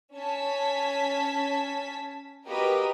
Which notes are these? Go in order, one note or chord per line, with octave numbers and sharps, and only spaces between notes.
C#4 A5 G#6 B6
A#3 F#4 G4 A#4 B4 D#5